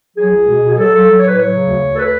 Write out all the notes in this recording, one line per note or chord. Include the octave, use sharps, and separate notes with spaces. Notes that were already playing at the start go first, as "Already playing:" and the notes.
F#3 G#4
C#2
B2
B2
G#4
F#3 A4
F#3 A4
F#3
A2 C#5
B4
F#3 C#5
C#3
D2
D2
A4
B4